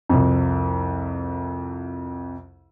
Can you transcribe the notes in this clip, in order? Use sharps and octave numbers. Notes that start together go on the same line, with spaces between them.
C2 F2